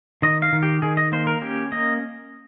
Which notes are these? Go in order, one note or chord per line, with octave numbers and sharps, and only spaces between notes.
D#3 D#5
F5
D#3
G4
D#3 G#4
D#5
A#3 C5
A#4
C#4 G4
A#3 D#5